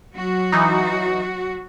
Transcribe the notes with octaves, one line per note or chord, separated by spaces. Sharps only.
F#3 F#4
E3 D#4